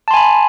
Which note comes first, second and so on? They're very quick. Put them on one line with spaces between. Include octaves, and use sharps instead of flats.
A5 C6 G#5 B5